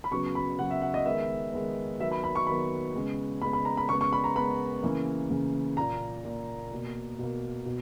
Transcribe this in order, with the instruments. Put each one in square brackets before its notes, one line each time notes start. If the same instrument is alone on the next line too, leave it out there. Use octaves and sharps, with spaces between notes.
[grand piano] B5
C#3 F#3 B3 C#6
B5
C#3 F#3 B3 F#5
E5
F#5
D#5
D#3 G#3 B3 E5
D#3 G#3 B3
D#3 F#3 B3 E5
B5
B5
C#6
D#3 F#3 B3 B5
C#3 G#3 B3
C#3 G#3 B3 B5
B5
A#5
B5
C#3 G#3 B3 C#6
C#6
B5
A#5
C#3 G#3 B3 B5
C#3 E3 A#3
C#3 E3 A#3
A#2 A#3 A#5
A#2 A#3
B2 A#3
B2 A#3
B2